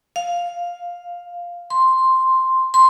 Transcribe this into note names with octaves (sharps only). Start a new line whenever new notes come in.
F5
C6
C6